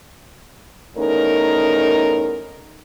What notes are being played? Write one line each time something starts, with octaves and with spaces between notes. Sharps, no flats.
E2 A3 C#4 D#4 A#4